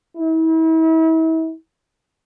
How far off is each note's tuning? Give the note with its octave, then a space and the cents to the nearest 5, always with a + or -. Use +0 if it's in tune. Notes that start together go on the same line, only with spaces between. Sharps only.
E4 -40